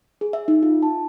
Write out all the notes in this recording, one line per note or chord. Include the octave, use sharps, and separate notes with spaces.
G#4
E5
D#4
F4
A5